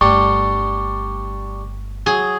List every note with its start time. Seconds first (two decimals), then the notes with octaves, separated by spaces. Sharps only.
0.01 G1 G3 A3 D4 C#6
2.06 F#3 G#4